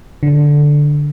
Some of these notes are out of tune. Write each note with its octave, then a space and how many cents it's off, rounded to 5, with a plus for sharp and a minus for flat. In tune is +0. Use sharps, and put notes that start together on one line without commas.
D3 -5